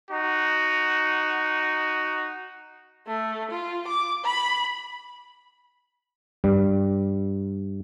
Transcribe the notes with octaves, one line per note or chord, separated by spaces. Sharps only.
D#4 F#4
A3
F4
D6
B5
G2 G3